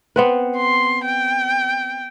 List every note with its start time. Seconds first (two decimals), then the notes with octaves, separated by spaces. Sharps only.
0.16 B3 C4 B4
0.57 C6
1.06 G5